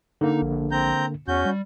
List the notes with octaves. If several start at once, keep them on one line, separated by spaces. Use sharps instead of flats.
D3 A#3 D#4
A#1
C4 A#5 G6
E2 C#4 F#4 G6
G3